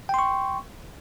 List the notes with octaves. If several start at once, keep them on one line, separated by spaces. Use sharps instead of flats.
G5 C6 C#6